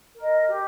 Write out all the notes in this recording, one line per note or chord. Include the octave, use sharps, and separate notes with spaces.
A#4 D#5
G4